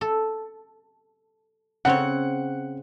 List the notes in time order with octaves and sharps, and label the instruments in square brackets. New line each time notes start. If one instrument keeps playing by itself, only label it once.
[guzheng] A4
[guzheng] C#3 C4 C#5 [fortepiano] F#5